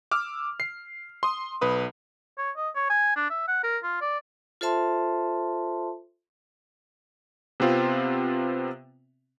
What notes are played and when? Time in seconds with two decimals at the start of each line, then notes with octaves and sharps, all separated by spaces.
0.11 D6 E6 F6
0.60 C7
1.23 C6 D#6
1.61 B1 B4 D#6
2.39 C#5
2.57 D#5
2.76 C#5
2.90 G#5
3.16 D4
3.30 E5
3.48 F#5
3.64 A#4
3.84 F4
4.02 D5
4.61 F4 A4 C5 E5 A5 C6
7.60 C3 B3 C4 F4